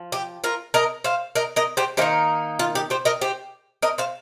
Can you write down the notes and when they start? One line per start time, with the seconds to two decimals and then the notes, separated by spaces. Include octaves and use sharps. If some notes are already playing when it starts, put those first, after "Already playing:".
Already playing: F3
0.12 G4
0.44 F4 A#4
0.74 A#4 D#5
1.04 C5 F5
1.35 A#4 D#5
1.56 A#4 D#5
1.77 G4 C5
1.97 D#3 A#3 D#4 G4 C5
2.59 F4
2.75 G4
2.90 G4 C5
3.05 A#4 D#5
3.21 G4 C5
3.82 A#4 D#5
3.98 C5 F5